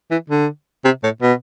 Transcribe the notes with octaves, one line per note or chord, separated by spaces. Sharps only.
E3
D3
C3
A2
B2